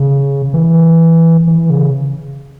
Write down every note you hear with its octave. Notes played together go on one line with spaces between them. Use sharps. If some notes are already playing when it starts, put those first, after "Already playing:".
Already playing: C#3
E3
E3
C#3